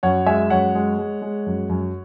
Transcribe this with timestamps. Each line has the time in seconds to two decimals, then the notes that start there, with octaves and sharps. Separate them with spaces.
0.03 F#2 C#5 F#5
0.26 G#3 E5 G#5
0.50 F#2 C#5 F#5
0.75 G#3
0.98 G#3
1.22 G#3
1.46 F#2
1.69 F#2